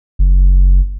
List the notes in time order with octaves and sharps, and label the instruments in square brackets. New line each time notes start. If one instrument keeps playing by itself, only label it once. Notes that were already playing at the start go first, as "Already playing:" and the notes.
[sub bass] F#1